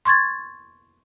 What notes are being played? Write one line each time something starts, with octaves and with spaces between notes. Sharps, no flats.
C6 C#6 G#6 A6